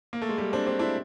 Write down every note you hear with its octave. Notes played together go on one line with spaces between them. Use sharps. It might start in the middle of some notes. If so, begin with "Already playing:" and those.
A#3
A3
G#3
G3 A3
C4 D4
C4 D4
D4 E4